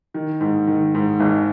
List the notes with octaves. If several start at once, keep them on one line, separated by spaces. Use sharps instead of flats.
D#3
G#2
D#3
G#2
G#1